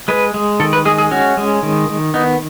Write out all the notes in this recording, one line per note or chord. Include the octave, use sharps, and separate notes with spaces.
G#3 B4
G#3
D#3 A4
B4
G#3 G#4
G#4
C#4 F#4
G#3
D#3
D#3
B3 D#4